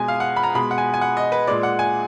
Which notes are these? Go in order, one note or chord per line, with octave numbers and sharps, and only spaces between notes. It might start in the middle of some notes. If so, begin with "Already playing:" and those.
Already playing: B2 G#3 G#5
F5
F#5
B5
A#5
B2 G#3 B5
F#5
G#5
G#5
F#5
D#5
B4
A#2 G#3 D5
F#5
G#5